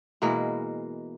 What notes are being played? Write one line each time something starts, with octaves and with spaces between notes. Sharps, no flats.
B2 E3 G#3 A#3